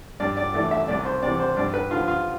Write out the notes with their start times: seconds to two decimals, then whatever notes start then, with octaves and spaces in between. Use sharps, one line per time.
0.20 G2 D5
0.37 D5
0.54 E3 A3 E4 D5
0.71 E5
0.88 C2 D5
1.05 C5
1.22 C3 D5
1.27 E3
1.40 C5
1.57 G2 D5
1.74 B4
1.91 D3 F3 F4
2.08 F4